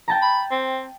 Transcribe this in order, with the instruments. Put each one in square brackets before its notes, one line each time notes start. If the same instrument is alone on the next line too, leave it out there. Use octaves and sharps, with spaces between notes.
[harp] G5 A5 A#5
[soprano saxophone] B5
C4